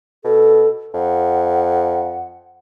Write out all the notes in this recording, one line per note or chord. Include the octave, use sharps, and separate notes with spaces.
B2 A4
F2 F#5